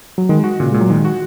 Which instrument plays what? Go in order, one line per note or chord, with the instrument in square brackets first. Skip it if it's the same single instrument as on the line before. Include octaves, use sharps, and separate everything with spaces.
[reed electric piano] F#3
[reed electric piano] D#3 [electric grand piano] G#3
[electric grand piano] F#4
[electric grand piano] A#2 [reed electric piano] C#3
[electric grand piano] A#2 [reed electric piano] G#3
[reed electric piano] F#3
[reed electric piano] D#3 [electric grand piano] G#3
[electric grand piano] F#4